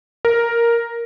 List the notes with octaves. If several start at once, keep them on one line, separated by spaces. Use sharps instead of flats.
A#4